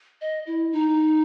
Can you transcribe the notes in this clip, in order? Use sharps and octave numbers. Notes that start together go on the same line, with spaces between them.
D#5
E4
D#4